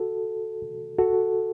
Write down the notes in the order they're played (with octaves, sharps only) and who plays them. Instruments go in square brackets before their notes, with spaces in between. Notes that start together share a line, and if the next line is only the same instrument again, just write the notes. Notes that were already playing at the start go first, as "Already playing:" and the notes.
Already playing: [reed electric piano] F#4 A4
F#4 A4